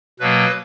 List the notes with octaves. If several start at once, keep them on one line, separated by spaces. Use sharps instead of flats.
B2 F#3 A#3 B4